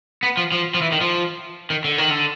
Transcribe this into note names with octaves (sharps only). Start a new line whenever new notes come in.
B3
F3
F3
F3
E3
D#3
F3
D#3
D3
D#3
D3